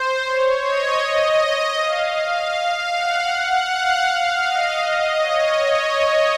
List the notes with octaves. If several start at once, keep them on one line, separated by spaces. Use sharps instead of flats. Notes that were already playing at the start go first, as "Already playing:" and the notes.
Already playing: C5
C#5
D#5
D#5
F5
F5
F5
F#5
F#5
F5
D#5
C#5